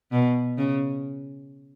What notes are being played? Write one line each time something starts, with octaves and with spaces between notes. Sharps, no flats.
B2
C#3